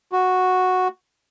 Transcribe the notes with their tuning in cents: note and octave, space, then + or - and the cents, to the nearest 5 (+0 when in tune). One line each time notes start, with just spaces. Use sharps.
F#4 -5